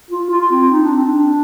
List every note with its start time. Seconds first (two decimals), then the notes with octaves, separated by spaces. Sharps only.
0.11 F4
0.30 F4
0.52 C4
0.71 D#4
0.83 D4
0.95 C4
1.06 D4